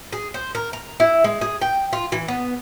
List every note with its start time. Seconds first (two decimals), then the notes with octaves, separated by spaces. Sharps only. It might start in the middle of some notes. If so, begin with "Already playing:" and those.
0.13 G#4
0.34 C5
0.55 A#4
0.73 A#5
1.00 E4
1.24 G#3
1.41 G#4
1.61 G5
1.93 F4
2.12 E3
2.28 B3